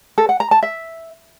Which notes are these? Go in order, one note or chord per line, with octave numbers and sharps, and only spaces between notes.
A4
F#5
A#5
A5
E5